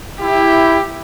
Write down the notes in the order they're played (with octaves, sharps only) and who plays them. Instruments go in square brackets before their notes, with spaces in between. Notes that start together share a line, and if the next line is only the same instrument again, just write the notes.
[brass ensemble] E4 [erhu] G4